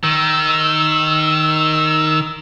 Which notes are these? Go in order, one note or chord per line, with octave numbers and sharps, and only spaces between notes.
D#3 E6